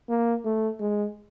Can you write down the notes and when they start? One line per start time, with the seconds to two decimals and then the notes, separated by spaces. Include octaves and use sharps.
0.09 A#3
0.45 A3
0.80 G#3